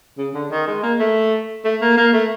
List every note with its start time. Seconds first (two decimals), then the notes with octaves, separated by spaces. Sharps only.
0.18 C#3
0.34 D3
0.51 D#3
0.67 G#3
0.83 A#3
0.99 A3
1.65 A3
1.81 A#3
1.97 A#3
2.13 A3